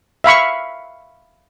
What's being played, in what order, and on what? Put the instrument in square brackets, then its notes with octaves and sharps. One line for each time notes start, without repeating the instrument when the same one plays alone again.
[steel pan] E5 F5 B5 C#6